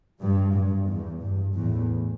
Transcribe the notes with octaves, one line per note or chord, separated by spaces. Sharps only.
G2
G2
E2
G2
E2 A2